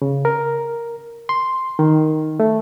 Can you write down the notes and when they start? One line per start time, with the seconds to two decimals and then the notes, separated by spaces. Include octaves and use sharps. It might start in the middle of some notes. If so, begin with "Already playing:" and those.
0.02 C#3
0.25 A#4
1.29 C6
1.79 D#3
2.40 A3